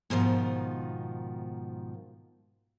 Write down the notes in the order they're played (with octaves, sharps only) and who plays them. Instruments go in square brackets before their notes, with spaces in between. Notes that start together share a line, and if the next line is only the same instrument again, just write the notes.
[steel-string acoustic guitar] G#2 B2 D#3 F3